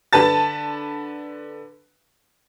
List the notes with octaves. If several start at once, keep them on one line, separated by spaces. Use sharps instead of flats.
D3 B4 A5 A6